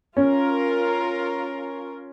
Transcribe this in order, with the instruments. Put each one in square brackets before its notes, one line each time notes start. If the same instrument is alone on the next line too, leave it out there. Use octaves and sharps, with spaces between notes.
[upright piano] C#4 [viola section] F4 A#4